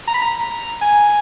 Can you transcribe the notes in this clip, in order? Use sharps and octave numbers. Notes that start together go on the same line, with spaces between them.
A#5
B5
A#5
G#5